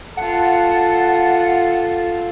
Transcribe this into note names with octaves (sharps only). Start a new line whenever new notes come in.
F4 A4 F#5 A5